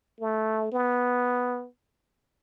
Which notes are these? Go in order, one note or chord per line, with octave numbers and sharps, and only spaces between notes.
A3
B3